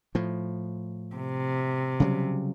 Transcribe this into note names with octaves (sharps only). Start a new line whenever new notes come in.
A2 F3
C3
C#3 F#3 G3